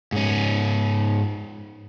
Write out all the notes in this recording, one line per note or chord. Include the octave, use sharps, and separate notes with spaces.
G#2 C#4